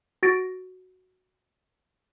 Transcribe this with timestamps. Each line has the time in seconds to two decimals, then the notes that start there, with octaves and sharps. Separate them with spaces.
0.23 F#4 A6 A#6 D7